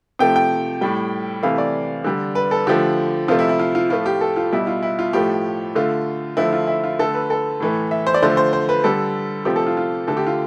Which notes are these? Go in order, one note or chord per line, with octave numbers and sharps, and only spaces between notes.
C3 F3 A3 G5
G5
A2 G3 G5
C3 E3 A3 F5
D5
D3 G3
B4
A4
D3 F3 A3 G4
C3 F3 A3 F4
E4
E4
F4
F4
A2 F3 A3 F4
G4
A4
F4
B2 G3 E4
F4
E4
F4
A2 F3 A3 G4
D3 A3 F4
D3 F3 A3 E4
F4
E4
F4
D3 A3 A4
B4
A4
A2 E3 A3
E5
C5
D5
D3 F3 A3 C5
C5
C5
B4
D3 G3 A4
C3 F3 A3 G4
A4
F4
F4
D3 A3 A4
G4
F4